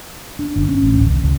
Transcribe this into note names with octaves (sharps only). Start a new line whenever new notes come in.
D4
G1
C#4
A1
D1
C2
C#2